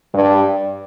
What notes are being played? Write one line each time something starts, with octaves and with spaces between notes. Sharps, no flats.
G2